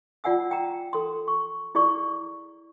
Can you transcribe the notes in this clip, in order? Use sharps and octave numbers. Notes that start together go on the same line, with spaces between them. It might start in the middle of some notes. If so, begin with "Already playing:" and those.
F4 D5 F#5 G#5 E6
G5 A#5
A4 C6
C#6
E4 G#4 D5 C#6